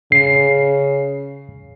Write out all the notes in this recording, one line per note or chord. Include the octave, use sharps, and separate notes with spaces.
C#3 C7